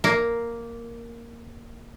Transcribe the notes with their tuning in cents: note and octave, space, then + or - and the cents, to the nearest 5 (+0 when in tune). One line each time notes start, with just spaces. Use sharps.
A#3 +0